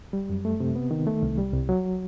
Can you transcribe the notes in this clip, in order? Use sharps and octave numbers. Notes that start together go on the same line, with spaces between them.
G3
F#2
A3
C3
B3
D#3
A3
C2
G3
C2
F#3